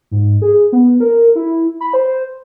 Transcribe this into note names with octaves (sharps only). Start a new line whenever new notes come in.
G#2
G#4
B3
A#4
E4
B5
C5